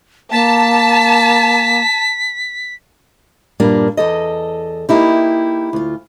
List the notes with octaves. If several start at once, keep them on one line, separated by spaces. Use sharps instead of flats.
A#3 A5 B6
G2 A#2 G3 A#3 D4
E2 A4 D#5
A#3 D#4 E4 G4
D2 F4